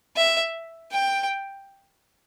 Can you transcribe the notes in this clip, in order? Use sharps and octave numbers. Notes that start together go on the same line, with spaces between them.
E5
G5